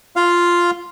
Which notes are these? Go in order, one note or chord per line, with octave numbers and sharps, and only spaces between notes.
F4 F5